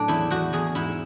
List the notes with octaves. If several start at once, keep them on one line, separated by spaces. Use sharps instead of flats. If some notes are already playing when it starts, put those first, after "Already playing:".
Already playing: A2 F#3 D4
E2 E4
E2 F#4
E2 G#4
G#2 E4